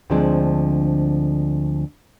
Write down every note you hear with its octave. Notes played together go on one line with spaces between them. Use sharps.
D2 D3 F3 G#3 C4 D4